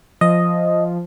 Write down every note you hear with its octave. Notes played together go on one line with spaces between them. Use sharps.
F3 D#5